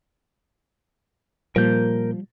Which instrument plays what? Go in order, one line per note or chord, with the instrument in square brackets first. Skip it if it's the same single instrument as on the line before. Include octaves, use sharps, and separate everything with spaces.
[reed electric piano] A#2 A#3 [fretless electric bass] F3 [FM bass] G3 [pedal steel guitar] A#4 G6